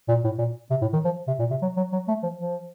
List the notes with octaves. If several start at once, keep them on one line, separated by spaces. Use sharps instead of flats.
A#2
A2
A#2
C3
A2
D#3
F3
C3
A#2
C3
F#3
F#3
F#3
A3
F3
F3